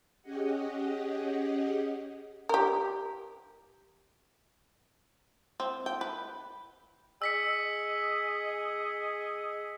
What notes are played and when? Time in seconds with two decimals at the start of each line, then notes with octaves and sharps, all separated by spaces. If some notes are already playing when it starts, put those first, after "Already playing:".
0.22 C#4 G4 G#4 D#5 F#5
2.49 G4 A#4
5.60 C4
5.86 G5
6.01 B4
7.22 G#4 D#5 E6 B6 C#7